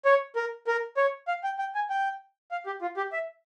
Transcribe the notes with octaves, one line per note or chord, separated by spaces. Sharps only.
C#5
A#4
A#4
C#5
F5
G5
G5
G#5
G5
F5
G4
F4
G4
E5